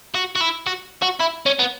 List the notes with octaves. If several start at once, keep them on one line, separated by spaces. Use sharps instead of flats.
F#4
F#4
E4
F#4
F#4
E4
C#4
B3